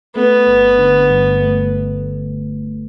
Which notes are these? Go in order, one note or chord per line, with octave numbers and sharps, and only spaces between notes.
A3 B3
G1
D3
G2
A3